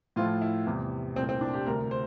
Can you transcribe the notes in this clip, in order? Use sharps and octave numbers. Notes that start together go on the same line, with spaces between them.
A2 F3 A3 F4
E4
E2 C3 G3
C2 A#2 A3 C4
C4
D4
G4
D2 C3 G3 A#4
C5